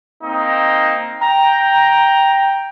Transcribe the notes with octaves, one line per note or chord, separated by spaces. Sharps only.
A#3 C4 D#4
G5 A#5